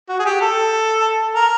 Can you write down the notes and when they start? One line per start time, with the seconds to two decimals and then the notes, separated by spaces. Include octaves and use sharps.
0.09 F#4
0.19 G#4
0.25 G4
0.41 A4
1.35 A#4